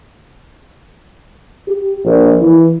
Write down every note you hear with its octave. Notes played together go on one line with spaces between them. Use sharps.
G4
A#1
E3